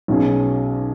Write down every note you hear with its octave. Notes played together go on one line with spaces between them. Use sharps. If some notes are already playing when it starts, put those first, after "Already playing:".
B1 B2 F#3 C#4 G#4